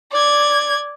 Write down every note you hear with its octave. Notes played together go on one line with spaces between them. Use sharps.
D5 G#6